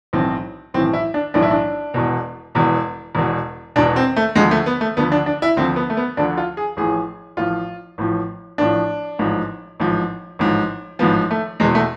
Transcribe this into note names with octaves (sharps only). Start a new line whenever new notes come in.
B1 A2 E3 C4
B1 A2 E3 C4
E4
D4
B1 A2 E3 D4
E4
D4
E1 E2 B2
E1 E2 B2
E1 E2 B2
E1 E2 B2 D4
C4
A3
D2 D3 F3 G#3
A3
B3
A3
D2 D3 F3 B3
D4
D4
E4
D2 D3 F3 C4
B3
A3
B3
D2 D3 F3 D4
F4
G#4
A1 A2 F3 G#4
A1 A2 F3 F4
A1 A2 F3
A1 A2 F3 D4
A1 G#2 F3
A1 G#2 F3
A1 G#2 F3
A1 G#2 F3 B3
A3
E2 B2 G#3
A3